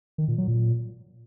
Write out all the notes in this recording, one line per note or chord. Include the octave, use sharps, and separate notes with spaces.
D#3
A#2
F#3
A#2